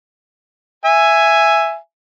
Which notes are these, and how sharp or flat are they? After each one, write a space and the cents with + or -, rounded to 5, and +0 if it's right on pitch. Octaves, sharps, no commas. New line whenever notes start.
E5 +10 G#5 +0